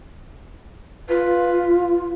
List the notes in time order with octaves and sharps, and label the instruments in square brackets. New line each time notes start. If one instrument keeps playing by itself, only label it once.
[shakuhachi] F4 [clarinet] B4